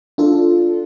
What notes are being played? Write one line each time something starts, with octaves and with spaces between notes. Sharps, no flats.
D4 F4 A4